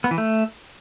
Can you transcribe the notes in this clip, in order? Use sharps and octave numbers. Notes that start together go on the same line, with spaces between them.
B3
E3
A3